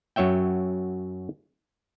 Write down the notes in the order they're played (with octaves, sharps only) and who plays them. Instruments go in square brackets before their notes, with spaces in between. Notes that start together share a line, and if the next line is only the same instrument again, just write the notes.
[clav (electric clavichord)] F#2 F#3 C#5 E5 G5